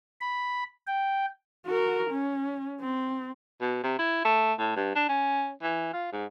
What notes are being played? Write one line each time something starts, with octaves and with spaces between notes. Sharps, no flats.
B5
G5
F#4 A#4
C#4
C4
B2
C3
E4
A3
A2
G2
D4
C#4
E3
F4
G#2